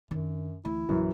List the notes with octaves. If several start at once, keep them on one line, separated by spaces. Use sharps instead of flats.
F#2 D#3 D4
D2 E3 E4
A#1 F#2 E3